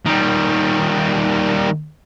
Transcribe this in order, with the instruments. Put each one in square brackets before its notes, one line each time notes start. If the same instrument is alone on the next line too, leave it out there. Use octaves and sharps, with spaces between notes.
[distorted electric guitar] D#3 G3